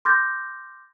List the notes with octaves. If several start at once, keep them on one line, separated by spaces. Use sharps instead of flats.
C6 D6 F6 G6 A6 A#6